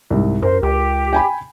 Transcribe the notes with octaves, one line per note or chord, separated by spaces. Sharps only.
C2 G#2
F#2 A#4 C5
C#2 G4
G5 G#5 B5